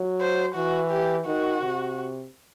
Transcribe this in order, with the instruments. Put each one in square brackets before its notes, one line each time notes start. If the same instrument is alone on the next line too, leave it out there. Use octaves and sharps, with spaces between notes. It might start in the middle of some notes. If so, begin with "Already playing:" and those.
Already playing: [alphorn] F#3
[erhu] C5
[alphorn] E3 [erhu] F#4
[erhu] G4
[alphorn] D#3 [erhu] F#4
[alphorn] C3